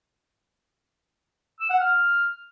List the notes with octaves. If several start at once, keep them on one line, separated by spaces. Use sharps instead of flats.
E6
F#5
F6